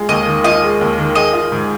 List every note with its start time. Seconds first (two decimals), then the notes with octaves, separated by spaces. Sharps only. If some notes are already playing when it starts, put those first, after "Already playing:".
Already playing: G#3 F4
0.09 D#2 D#5
0.26 D#3
0.44 F4 D#5
0.63 G#3
0.81 D#2
0.98 D#3
1.15 G#4 D#5
1.33 F4
1.52 G#2